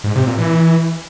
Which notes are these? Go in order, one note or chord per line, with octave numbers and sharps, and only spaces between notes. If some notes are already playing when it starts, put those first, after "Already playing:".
G#2
C3
A#2
E3